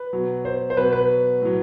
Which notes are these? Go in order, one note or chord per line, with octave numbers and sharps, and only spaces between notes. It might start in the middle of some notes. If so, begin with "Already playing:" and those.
Already playing: B4
B2 F#3
C5
C5
B2 F#3 B4
B4
A2 F#3